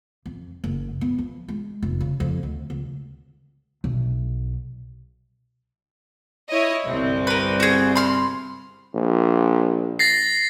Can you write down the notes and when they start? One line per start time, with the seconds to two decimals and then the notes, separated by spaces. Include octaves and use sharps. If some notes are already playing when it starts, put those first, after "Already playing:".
0.26 F2
0.64 F#1
1.01 B3
1.18 F3
1.48 G#3
1.83 F1
2.01 C#3
2.20 F2
2.43 D2
2.70 C#2
3.84 B1
6.49 E4 C#5 D#5
6.85 G1 C2 C4
7.27 A#4 B4
7.60 F#4 G#4
7.96 B5 C6 F6
8.94 A#1
9.99 A6 A#6 C7